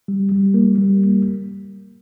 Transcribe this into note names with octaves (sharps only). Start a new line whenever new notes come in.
G3
G3
A#3
G3